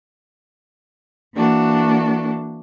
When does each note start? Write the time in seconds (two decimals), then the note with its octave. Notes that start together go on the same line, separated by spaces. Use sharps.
1.34 E3 A#3 D4 F#4 A4